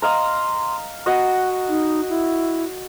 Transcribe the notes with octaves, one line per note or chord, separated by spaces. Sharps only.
D#5 F5 A#5 C6
F#4 D#5 F#5
D#4
E4